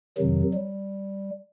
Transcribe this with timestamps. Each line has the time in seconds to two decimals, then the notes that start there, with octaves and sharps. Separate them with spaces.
0.18 F2 C3 D#3 F#3
0.54 G3